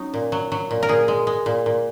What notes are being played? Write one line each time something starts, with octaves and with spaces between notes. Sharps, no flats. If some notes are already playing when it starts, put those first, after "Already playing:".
Already playing: F#3 C#4 D#4
A#2
F#3
F#3
A#2
A#4
A#2 G#4
G#3
G#3
A#2
A#2